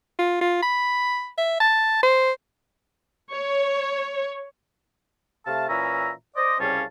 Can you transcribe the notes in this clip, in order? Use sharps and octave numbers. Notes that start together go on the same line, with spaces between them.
F4
F4
B5
E5
A5
C5
C#5
C3 A3 F5 A5
A#2 E3 C#4 E4 E5 A#5
C5 D5 D#5
C2 C#3 G3 C#4 F5 A5